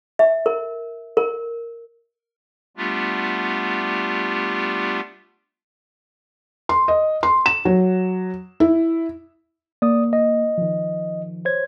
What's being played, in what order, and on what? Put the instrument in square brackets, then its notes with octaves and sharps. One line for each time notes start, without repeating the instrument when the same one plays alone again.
[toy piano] E5
A#4
A#4
[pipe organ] G3 A3 B3 D4 F4 G4
[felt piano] C6
D#5
C6
E7
F#3
E4
[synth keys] A#3 [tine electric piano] D5 D#6
[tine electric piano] D#5
[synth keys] D#3 F3
[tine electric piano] C5 C#5 G#6